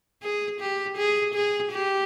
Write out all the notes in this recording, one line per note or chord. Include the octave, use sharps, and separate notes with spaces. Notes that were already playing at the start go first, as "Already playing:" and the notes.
G#4
G4
G#4
G#4
G4